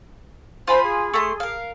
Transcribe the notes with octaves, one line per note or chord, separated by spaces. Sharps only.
F4 C5 G#5 B5
G#4
A3 A#5 C6
A#4 F5